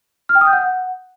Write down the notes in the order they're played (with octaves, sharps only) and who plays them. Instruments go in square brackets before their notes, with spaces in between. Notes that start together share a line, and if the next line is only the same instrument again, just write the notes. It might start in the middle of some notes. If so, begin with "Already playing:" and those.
[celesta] F6
G5
D#6
G6
F#5